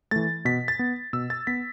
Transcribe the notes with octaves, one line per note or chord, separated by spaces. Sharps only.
E3 A3 A6
B2 B6
A6
B3
B2 E6
A6
B3 B6